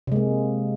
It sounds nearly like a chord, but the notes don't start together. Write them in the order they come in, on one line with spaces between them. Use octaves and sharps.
C3 G#3 A#3